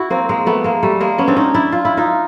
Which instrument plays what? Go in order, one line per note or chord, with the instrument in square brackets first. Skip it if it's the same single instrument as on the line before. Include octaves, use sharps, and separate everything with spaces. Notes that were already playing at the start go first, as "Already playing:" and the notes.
Already playing: [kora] E4 F#4
A#3 C4
G#3 A#3
A3 B3
G#3 A#3
G3 A3
G#3 A#3
B3 C#4
C4 D4
C#4 D#4
D4 E4
F4
E4
D#4 F4